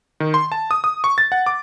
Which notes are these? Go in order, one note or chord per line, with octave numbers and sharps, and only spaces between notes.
D#3
C6
A5
D#6
D#6
C#6
A6
F#5
D6